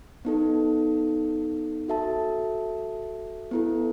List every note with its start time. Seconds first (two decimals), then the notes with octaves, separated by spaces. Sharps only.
0.25 B3 D#4 A4
1.88 F#4 A4 E5 A5
3.51 B3 E4 A4